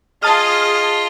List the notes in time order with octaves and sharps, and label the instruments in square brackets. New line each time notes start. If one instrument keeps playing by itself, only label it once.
[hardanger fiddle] F4 D#5 [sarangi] G#4 [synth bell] A5 D#6 F6